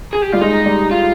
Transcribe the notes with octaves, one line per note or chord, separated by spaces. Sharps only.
G#4
G4
G3 F4
G#3 D#4
G3
F4